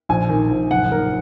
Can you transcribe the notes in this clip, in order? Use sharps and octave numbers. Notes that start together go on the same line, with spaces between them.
A#1 G#5
D#3
A#1
F#1 F#5
D#3 A#4